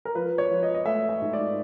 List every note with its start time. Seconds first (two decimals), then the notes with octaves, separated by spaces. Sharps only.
0.05 A#4
0.15 F3 B4
0.38 C#5
0.51 F3
0.63 D#5
0.75 D#5
0.85 A3 E5
1.09 E5
1.22 G#2
1.33 D5